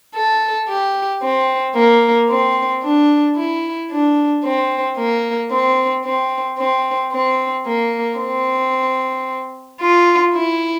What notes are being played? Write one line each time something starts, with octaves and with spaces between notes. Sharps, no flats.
A4
G4
C4
A#3
C4
D4
E4
D4
C4
A#3
C4
C4
C4
C4
A#3
C4
F4
E4